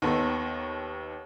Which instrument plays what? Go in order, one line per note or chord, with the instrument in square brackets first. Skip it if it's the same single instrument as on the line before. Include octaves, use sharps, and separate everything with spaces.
[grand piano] D#2 D#3 B3 A4